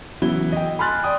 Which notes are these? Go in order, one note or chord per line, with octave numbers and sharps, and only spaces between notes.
C#3 E3 F#3 B3 E4 G7
D#5 G5
G#5 B5 C6 F6 F#6 A6
D5 G5 D#6